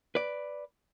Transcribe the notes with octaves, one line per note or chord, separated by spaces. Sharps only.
B4 D5